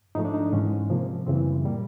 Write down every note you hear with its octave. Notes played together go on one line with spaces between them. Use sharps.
G#2 F3 A3 D#4
D4
D#4
G#2 E3 G#3 C#4
C3 F3 A#3
F#2 C#3 E3 G3 C4
A#2 G3 A#3